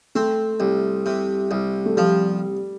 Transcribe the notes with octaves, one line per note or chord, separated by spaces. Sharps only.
A3 C4
C2
C3
C2
A3
F3 G3